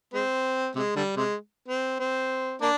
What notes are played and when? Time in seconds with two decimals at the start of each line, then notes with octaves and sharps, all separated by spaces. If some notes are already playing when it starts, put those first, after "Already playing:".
0.14 G#3 C4
0.75 C3 G#3
0.96 D3 G3
1.17 C3 G#3
1.68 C4
1.99 C4
2.61 A#3 D4